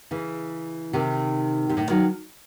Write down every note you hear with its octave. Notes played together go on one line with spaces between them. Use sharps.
C#3 E3
C3 D#3
C3
A2
D#3 F#3